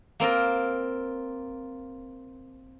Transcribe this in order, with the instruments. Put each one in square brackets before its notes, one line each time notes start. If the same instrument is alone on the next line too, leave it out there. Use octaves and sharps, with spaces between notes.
[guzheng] A#3 C4 F4 A#4